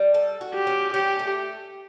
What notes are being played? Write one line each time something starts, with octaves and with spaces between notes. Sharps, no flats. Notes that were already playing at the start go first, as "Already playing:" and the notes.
Already playing: G3
A4
F#4
G4
C#4
C#4 G4
A3